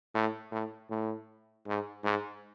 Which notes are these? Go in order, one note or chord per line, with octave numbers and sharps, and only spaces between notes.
A2
A2
A2
G#2
G#2